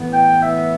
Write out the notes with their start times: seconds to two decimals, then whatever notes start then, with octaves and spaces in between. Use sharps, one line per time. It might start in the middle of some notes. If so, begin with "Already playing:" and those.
Already playing: A2 E3 B3
0.11 G5
0.41 E5